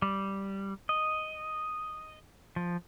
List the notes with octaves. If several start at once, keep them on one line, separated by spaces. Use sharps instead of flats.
G3
D#5
F3